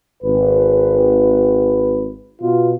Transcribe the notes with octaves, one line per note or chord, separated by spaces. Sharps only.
G#1 B4
B2 F4